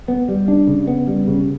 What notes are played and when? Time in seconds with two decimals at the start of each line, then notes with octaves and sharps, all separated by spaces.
0.08 B3
0.29 G3
0.48 D4
0.67 C#3
0.87 B3
1.07 G3
1.27 C#3